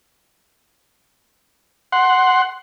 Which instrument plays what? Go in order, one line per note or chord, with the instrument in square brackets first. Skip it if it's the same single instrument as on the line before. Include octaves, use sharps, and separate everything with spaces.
[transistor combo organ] F#5 C6